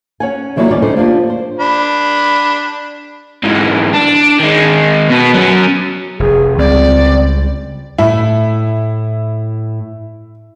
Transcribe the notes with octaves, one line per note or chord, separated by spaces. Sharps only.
C#4 C#5 F#5 G#5
D3 E3 F#3 G3 A#3 E4
D2 D#3 G3 C#4 C#5 D5
D3 A3 D#4 C5
F3 A#3 D4 G4
C5
D4 B5
G#2 E3
D4
D#3 G#3
B2 B3
F#3 C#4
F1 G#4
C#2 G3 C4 D5
A2 E4 A5